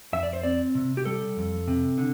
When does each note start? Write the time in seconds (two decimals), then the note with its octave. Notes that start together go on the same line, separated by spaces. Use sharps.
0.13 F2 E5
0.23 D5
0.33 C5
0.43 C4 D5
0.75 C3
0.97 G4
1.05 G3 A4
1.37 F2
1.68 C3
1.98 D3